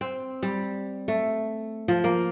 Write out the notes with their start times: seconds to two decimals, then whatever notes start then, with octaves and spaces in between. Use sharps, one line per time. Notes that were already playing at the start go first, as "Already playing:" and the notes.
0.01 C4
0.43 G3
1.08 A3
1.88 F3
2.04 A#3